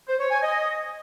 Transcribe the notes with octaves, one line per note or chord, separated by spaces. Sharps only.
C5
C#5
G#5
D#5